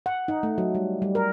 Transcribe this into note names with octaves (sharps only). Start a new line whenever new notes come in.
F#5
D#4
A3
F#3
G3
G3
A#4